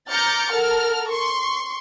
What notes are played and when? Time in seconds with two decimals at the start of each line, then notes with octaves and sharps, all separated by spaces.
0.10 A#5 D6 F6 G6 A6 C#7
0.50 A4 A#4 F#5 F6
1.10 C6 C#6